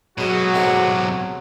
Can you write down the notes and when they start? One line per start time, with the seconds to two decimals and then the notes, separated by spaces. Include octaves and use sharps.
0.18 B1 B2 F#3 G#3 F#4
0.54 B1 G#2 C3 D#3 A3